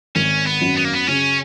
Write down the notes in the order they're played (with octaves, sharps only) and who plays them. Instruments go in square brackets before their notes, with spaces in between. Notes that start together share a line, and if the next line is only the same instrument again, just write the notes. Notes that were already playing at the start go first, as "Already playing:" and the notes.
[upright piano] G#1 [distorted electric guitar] C#4
[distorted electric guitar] B3
[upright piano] F#2
[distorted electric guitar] B3
A#3
B3
[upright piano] C#3 [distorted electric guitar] C#4